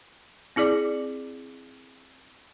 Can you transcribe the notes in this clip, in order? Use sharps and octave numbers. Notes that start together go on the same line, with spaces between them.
C4 E4 G#4 D5 D6